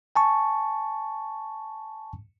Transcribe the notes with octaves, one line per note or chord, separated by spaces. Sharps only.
G#5 A5 C#6